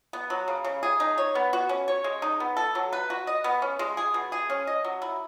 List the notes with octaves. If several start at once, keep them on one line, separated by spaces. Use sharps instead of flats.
B3
F#3
C#3
C#3
G#4
D#4
C#5
B3
F#4
C#4
C#5
G#3
D#4
B3
A4
F#3
B4
F#4
D#5
B3
C#4
G#3
G#4
B2
G#4
C#4
D#5
F#3
E4